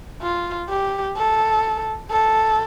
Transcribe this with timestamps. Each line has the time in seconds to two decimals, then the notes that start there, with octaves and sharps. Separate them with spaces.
0.22 F4
0.70 G4
1.17 A4
2.11 A4